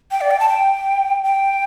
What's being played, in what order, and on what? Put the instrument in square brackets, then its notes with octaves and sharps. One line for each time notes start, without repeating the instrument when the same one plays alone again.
[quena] G5
D5
G5
A5
G5
G5